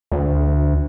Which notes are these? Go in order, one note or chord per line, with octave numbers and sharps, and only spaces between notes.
D2